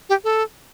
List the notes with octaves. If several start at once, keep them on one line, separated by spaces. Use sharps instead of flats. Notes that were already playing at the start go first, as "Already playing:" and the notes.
G4
A4